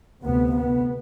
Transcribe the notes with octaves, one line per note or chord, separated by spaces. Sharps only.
D2 C3 B3
B3